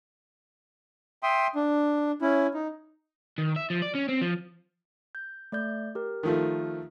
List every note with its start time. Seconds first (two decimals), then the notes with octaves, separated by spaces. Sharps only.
1.23 E5 G5 C6 D#6
1.55 D4
2.22 C#4 E4
2.54 D#4
3.38 D#3
3.56 E5
3.70 F3
3.82 D5
3.95 C#4
4.09 C4
4.21 F3
5.15 G6
5.52 A3 D5 G6
5.95 G4 A#4
6.23 D#3 F3 A3